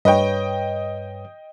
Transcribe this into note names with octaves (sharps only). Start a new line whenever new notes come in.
G2 B4 C#5 D#5 G5